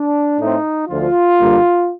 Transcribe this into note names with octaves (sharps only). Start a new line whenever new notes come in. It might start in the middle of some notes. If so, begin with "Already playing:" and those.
Already playing: D4
A2 A3 C4 D#4
D2 D3 F3 F4
G2 D3 G3 A#3